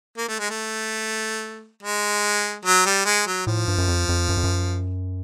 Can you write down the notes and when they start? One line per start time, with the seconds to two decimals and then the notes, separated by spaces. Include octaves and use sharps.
0.17 A#3
0.28 A3
0.39 G#3
0.50 A3
1.83 G#3
2.65 F#3
2.86 G3
3.06 G#3
3.27 F#3
3.47 A2 F3
3.68 G2
3.78 F#2
3.88 F2
4.09 F2
4.29 F#2
4.37 F2
4.44 F#2